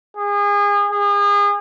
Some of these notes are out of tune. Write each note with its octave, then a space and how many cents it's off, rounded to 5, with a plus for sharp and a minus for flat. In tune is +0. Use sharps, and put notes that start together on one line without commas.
G#4 -30
G#4 -35